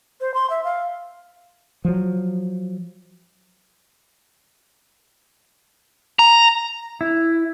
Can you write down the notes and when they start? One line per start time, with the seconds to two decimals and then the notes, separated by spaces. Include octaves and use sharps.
0.21 C5
0.34 C6
0.50 E5
0.64 F5
1.85 F3 F#3
6.19 A#5
7.01 E4